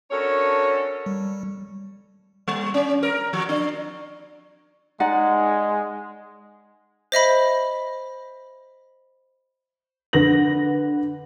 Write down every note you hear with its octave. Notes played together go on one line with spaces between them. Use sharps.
C#4 D4 F#4 A4 A#4 C#5
G3
G3
C#4
A#4
F3
D4
G#3 D#4 D5 F#5
C5 D#5 E5 B5
D3 B4 A#6 F#7